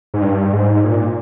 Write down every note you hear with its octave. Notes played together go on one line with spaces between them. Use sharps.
G#2
G2
G#2
A#2